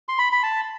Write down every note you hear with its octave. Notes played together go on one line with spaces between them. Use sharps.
C6
B5
B5
A5